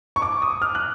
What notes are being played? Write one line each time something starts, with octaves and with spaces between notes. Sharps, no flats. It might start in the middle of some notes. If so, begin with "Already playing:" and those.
C#6
D6
D#6
F6
F#6